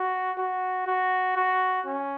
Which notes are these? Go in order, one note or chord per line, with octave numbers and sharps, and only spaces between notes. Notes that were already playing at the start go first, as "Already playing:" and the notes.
Already playing: F#4
F#4
F#4
F#4
C#4